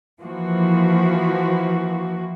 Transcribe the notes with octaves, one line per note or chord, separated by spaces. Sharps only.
E3 F3 A#3 F#4